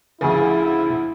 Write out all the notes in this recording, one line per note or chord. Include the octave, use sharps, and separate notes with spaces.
D2 C#3 F3 E4 G#4